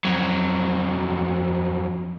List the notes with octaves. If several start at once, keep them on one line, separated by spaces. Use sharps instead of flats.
F2 F#3